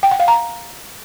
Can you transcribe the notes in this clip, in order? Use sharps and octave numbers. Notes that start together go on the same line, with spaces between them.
G5
F#5
F5
A#5